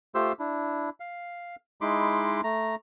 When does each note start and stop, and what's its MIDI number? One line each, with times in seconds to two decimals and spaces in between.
0.15 0.32 57
0.15 0.32 65
0.15 0.32 67
0.15 0.32 72
0.15 0.32 84
0.15 0.32 88
0.39 0.90 62
0.39 0.90 64
1.00 1.56 77
1.81 2.41 56
1.81 2.41 63
1.81 2.41 64
1.81 2.41 83
1.81 2.41 84
1.81 2.41 86
2.44 2.75 57
2.44 2.75 82